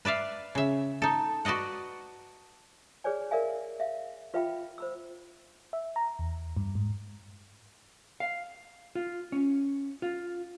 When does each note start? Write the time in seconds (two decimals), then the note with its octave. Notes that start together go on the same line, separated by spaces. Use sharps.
0.05 B4 D5 E5 F5
0.55 C#3 E5
1.02 D#4 A4
1.45 F#4 B4 D5 D#5 F#5
3.04 G#4 B4 C#5 D5 G#5
3.31 A#4 D5 E5 F5 G#5
3.80 E5 F5
4.34 F4 B4 E5 F5 G5 B5
4.78 C5 B5 E6
5.73 E5
5.96 A#5
6.19 E2
6.57 G2
6.75 G#2
8.20 F5
8.95 F4
9.32 C#4
10.02 F4